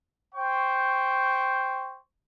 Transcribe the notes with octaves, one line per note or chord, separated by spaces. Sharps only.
C5 G5 C#6